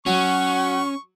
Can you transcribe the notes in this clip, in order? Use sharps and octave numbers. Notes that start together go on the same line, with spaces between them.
F#3 C#4 F#5 C#6